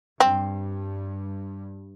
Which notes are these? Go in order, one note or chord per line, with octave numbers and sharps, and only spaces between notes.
G2 C4